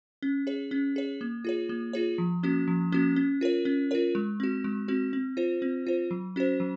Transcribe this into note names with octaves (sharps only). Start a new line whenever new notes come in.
C#4
G#4 C#5
C#4
G#4 C#5
A#3
F4 G#4 C#5
A#3
F4 G#4 C#5
F3
A#3 C#4 F#4
F3
A#3 C#4 F#4
C#4
F4 A#4 C#5
C#4
F4 A#4 C#5
G#3
C4 F#4
G#3
C4 F#4
C4
F4 C5
C4
F4 C5
F#3
C#4 F#4 C5
F#3